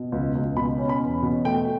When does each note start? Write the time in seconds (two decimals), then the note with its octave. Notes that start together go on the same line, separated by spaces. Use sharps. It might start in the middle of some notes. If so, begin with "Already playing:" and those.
Already playing: B2
0.12 C#2
0.35 C#2
0.56 B2 B5
0.78 C#4
0.89 B5
1.00 E2
1.22 B2
1.45 A3 G5